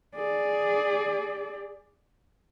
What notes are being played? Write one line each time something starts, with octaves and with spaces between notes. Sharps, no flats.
G#4 D5